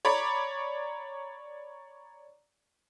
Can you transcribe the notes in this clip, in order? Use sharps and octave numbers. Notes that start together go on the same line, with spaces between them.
C#5 D5 A#5 B5 D6